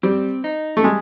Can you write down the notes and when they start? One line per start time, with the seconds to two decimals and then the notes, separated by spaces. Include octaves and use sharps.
0.03 G3 C4
0.44 D#4
0.77 A3
0.83 G3 G#3